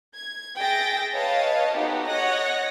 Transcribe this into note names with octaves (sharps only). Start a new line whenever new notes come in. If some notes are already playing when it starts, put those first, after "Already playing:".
G#6
G#4 E5 G5 A6 A#6
B4 C#5 D#5 F5 A5
B3 D#4 F#4 G4 A4
C#5 D#5 F#5 F#6 A#6